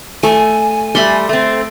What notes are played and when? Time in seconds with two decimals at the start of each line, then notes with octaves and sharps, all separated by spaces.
0.23 A3 G#5
0.95 G3 A3 B5 C6
1.29 A3 C4